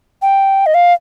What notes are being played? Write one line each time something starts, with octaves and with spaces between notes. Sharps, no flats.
G5
D#5
F5